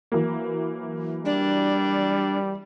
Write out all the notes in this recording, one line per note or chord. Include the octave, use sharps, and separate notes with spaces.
E3 F#3 A#3
G3 D4